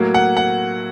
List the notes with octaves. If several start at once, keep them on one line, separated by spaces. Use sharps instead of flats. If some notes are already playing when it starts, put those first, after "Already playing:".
Already playing: A2 F#3 A#3
F#5
F#5